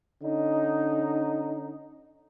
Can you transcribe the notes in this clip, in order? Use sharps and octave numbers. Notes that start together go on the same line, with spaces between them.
D3 C#4 D#4